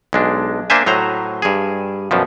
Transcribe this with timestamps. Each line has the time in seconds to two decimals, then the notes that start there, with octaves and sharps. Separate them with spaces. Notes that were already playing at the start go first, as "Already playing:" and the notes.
0.13 B1 G#3 D4
0.70 A#3 D4 C5 E5 G#5
0.86 A2 F#3 C5 A#5
1.42 G2 G#4
2.11 F#2 B2 F3